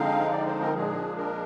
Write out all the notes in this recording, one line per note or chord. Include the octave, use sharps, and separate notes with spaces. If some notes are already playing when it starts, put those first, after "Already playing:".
Already playing: D3 F3 G#3 C4 D#4 F5
D5
C5
A#4
A#2 F3 G#3 D4 G#4
A#4